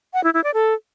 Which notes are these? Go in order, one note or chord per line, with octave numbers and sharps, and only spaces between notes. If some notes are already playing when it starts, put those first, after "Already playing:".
F#5
E4
E4
D5
A4